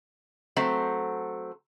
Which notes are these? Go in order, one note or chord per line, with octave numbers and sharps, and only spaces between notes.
F#3 A3 C4